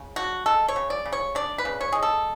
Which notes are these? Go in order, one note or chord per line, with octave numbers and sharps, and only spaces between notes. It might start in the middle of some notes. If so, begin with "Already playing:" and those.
Already playing: C#3
D4 F#4
G#3 A4
C#5
C#3
D5
C#3
C#5
D4 D5
B4
C#3
C#5
G#3 G#4
A4